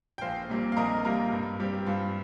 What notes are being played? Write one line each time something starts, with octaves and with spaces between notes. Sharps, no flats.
G5
A#1 C5 F5
A#2 G3 A#3
F5
A#1 A#4 D#5
A#2 G3 A#3 F4 A#4
G2
G3 C4 G4
G2 F4